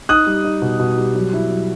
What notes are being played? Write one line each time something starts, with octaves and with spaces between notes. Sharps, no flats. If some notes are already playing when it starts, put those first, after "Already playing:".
D#4 D#6 F#6
G3
D#4
B2
B2
G3
F#3
E4
F#3